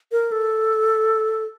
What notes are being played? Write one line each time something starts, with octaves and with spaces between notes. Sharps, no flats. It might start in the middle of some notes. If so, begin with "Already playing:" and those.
A#4
A4